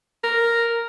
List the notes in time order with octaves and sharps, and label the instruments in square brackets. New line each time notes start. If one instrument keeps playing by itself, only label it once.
[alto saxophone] A#4